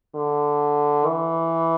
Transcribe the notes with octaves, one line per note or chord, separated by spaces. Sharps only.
D3
E3